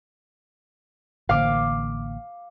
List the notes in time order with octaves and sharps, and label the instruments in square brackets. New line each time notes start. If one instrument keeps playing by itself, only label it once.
[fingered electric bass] A1 D3 A#3 [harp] F5 D6